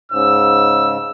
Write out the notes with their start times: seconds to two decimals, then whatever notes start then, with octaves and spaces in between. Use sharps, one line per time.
0.12 G#2 C#3 E6